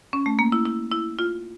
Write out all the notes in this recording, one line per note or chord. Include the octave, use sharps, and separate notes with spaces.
C#4
A3
A#3
E4
E4
E4
F4